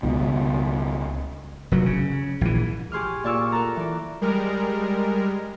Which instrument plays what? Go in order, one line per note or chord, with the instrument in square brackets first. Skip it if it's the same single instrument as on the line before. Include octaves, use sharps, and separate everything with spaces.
[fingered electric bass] C#2 B2
[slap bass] F1 F#3
C#3
A#1 E3
[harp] G4 G#4 C6 C#6 F6
A#2 D5 C#6 E6 F6
A4 A#4 F#5 A5 A#5
E3 D5
[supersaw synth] G3 G#3 A#4